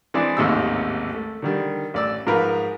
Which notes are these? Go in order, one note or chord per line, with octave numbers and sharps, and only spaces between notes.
E3 G#3 C4 D4 G#4 D5
A1 D#2 G#2 C3 D#4 E6
A3
D3 D#3 G3
A1 D5 E6
G#2 F3 A#4 B4